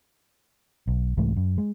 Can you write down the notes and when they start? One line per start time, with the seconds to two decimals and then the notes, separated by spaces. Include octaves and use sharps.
0.87 B1
1.17 C2 G#2 E3 A3
1.37 F#2
1.58 G#3